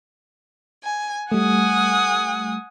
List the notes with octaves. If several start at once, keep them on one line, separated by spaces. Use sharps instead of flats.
G#5
G3 A3 F#5 G#5 D#6